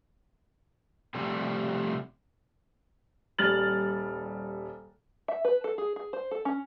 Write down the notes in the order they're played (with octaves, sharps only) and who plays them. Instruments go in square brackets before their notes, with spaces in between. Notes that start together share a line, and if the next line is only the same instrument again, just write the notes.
[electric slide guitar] C3 F3 G3 A3
[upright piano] D#1 G3 F6 A6 F#7
[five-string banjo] E5
B4
A4
G#4
G#4
C5
A4
C#4